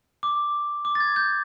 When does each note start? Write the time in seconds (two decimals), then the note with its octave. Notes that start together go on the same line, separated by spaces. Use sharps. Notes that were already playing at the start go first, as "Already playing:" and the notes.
0.23 D6
0.85 D6
0.95 A6
1.00 G#6
1.16 G6